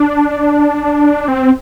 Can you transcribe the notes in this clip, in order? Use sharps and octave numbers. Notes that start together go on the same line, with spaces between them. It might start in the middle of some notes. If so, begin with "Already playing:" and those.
Already playing: D4
C4